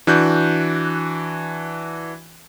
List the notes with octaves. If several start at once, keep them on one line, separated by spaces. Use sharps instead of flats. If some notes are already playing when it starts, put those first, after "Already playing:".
E3 D4 F#4 F#6 G6